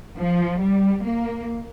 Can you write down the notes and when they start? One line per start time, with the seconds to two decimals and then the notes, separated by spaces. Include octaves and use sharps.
0.17 F3
0.60 G3
1.04 A#3